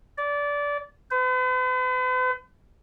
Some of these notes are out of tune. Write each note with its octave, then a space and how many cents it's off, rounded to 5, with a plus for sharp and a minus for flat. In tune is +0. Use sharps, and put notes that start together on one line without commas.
D5 -20
B4 +45